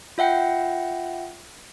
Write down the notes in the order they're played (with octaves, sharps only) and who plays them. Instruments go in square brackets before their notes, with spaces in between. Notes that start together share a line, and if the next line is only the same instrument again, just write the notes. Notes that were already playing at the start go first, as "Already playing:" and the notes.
[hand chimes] F4 E5 F#5 G5